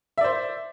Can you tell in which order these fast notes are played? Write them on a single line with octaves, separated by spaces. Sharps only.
E5 D5 C5